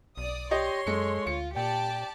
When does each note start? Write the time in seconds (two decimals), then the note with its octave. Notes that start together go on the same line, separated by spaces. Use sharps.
0.17 B1 D5 D#6
0.51 G4 C#5 D#5 C6
0.87 F#2 G#3 A4 C#7
1.27 D2 F4 C#7
1.57 A#2 G4 D5 G5 A5